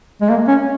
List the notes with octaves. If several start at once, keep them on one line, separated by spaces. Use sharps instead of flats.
G#3
A#3
C#4